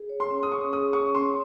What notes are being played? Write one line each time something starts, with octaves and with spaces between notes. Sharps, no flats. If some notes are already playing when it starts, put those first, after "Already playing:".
Already playing: G#4
C#5
C6
C#4
D#6
C#4 C#6
G#4 D#6
C#5 C#6
C#4 C6